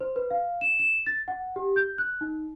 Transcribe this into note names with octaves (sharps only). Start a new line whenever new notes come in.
C5
B4
F5
E7
E7
A6
F#5
G4
G6
F#6
D#4